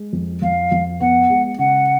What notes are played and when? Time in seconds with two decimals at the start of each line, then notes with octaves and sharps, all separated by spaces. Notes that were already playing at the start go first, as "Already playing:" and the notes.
Already playing: G#3
0.13 F2
0.42 F2 F5
0.72 F2
1.00 B3 F#5
1.30 G#3
1.59 C#3 F#5